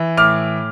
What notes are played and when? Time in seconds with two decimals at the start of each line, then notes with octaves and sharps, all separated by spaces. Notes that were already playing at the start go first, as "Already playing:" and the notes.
Already playing: E3
0.17 A2 D6 F6